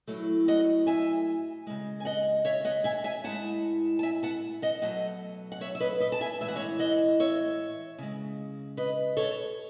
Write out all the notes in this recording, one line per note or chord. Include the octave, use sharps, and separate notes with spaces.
A2 F#3 A3
D#5 F#5
E5 G#5
C#3 G#3
G#5
D#5 F#5
C#5 E5
D#5 F#5
E5 G#5
E5 G#5
A2 G#3 F#5 A5
A5
E5 G#5
F#5 A5
D#5 F#5
B2 F#3 A3 D#5 F#5
F#5
C#5 E5
E5
B4 D#5
B4 D#5
A5
E5 G#5
A2 E3 G#3 E5
F#5
C#5 E5
D#5 F#5
C#5 E5
C#3 G#3
B4 D#5
A4 C#5